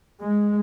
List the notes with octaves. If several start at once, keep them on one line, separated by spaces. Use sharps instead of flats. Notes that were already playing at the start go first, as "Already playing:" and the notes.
G#3